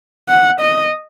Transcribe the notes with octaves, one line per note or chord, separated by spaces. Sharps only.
F#5
D#5